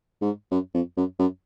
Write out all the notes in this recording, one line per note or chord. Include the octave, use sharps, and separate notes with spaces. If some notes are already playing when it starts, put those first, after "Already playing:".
G#2
F#2
F2
F#2
F#2